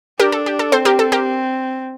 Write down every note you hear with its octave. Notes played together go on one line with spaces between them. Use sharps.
D4 G4 A#4
A4
G4
A4
C4 A4 C5
G4 A#4
A4
G4 A#4